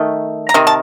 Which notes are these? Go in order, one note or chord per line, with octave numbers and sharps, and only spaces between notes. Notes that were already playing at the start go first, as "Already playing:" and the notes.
Already playing: D#3 A3
A#5
C3 D#3
A5